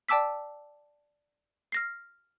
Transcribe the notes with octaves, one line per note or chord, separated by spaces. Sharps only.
D5 G5 A5 D6 E6 B6
F6 A#6 C7